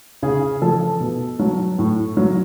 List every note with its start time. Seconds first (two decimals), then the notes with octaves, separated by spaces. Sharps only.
0.23 C#3 G#4
0.62 F3 A4
1.00 B2
1.39 F#3
1.78 A2
2.17 F#3